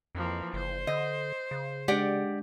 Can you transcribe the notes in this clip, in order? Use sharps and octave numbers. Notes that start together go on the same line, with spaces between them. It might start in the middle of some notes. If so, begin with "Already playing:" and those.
F2 E3 F3 A#3
F#1 C5
D3 D#5
C#3
G#3 D4 G4 D5 F#5